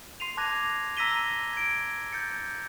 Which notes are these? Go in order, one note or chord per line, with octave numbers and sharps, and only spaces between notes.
C6 C7 D#7 F7
A5 D6 F#6 G#6 A#6 F7
A#5 E6 A#6 B6 D#7 G7
G#6 D7
G6 A6 C#7